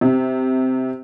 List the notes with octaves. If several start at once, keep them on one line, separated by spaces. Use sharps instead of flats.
C3